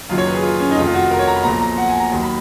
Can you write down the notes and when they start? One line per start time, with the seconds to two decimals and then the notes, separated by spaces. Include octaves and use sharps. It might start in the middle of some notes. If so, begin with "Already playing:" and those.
0.09 F#1 F#2 D#3 F#3 F4
0.18 C#5
0.27 B4
0.35 G#4
0.43 F4
0.60 C#4
0.71 D#4
0.77 F1 F2 D#3 F4
0.87 F4
0.94 F#4
1.11 A#4
1.19 C#5
1.28 A#5
1.36 B5
1.44 B1 A#2 F3 A#5
1.61 A#5
1.78 F#5
1.89 G#5
2.00 A#5
2.12 D#2 D#3 F#3
2.23 B5